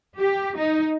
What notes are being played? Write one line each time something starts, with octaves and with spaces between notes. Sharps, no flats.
G4
D#4